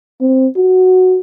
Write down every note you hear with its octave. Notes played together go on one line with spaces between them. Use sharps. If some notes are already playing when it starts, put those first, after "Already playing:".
C4
F#4